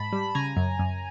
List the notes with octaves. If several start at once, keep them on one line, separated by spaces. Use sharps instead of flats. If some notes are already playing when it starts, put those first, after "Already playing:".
Already playing: G#2 A5 B5
G3
C#3 G#5 A#5
F#2
F#2